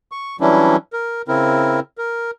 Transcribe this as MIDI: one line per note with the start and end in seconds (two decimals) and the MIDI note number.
0.12 0.36 85
0.41 0.76 52
0.41 0.76 54
0.41 0.76 55
0.41 0.76 61
0.41 0.76 62
0.41 0.76 64
0.93 1.22 70
1.28 1.80 49
1.28 1.80 60
1.28 1.80 64
1.28 1.80 70
1.98 2.31 70